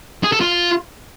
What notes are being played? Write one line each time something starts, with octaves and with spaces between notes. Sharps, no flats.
G#4
A4
F4